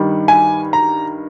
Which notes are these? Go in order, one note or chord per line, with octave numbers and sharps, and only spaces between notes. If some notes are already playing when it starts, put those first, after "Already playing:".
Already playing: G2 D#3 G3
G#5
A#5